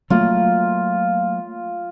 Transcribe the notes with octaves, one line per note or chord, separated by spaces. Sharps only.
F#3 A3 A#3 F4